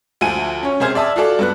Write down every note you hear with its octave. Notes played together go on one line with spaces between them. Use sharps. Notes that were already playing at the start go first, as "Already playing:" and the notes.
D2 F3 F#5 G#5 D#7
C#4 C#5
C3 G#4 C5 F6 G#6
D5 E5 A5 D#6
F4 F#4 A4 D5
G2 B3 F#6